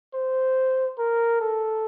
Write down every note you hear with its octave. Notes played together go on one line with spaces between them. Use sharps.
C5
A#4
A4